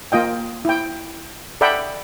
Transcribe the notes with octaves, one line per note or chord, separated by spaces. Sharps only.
A#3 F4 D#5 G5
E4 G5
A4 D5 E5 F#5 G5 B5